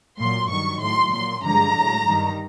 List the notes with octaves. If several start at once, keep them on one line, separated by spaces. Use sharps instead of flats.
A#2 F#3 C6
G2 D#3 F#3 C#6
A2 F#3 C6
A#2 F#3 C6
G2 D3 F3 G#3 A#5
A2 F#3
G2 D#3 G3